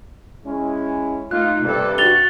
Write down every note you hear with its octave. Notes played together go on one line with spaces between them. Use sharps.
G#3 C#4 E4
A3 A#3 D#4 F4 F#6
G2 C3 A4
F#4 A6 F7 G7